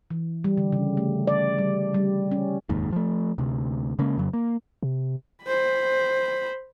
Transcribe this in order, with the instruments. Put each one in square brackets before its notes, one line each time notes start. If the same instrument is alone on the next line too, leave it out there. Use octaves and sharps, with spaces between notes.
[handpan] E3
G3
D3
C#3
A3
D5
G3
G3
C#4
[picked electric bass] F1 D#2 G#2
F3 A3
D2 C3
C#3 G#3 A#3 C#4
F2 C#3 F#3
A#3
[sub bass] C3
[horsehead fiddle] C5 B5